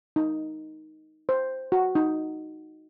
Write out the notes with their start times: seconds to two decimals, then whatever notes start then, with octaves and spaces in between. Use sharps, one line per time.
0.16 D#4
1.29 C5
1.72 F#4
1.95 D#4